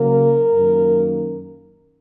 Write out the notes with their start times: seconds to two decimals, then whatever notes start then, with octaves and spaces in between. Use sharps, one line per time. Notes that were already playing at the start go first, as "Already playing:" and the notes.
Already playing: C#3 F#3 A#3 A#4
0.53 F#2 D#3 A#3